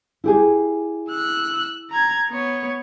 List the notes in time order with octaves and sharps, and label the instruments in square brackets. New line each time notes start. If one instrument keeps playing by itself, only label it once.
[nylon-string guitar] E4 G4 G#4
[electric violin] E6 F#6
A#5 G#6
B3 C#5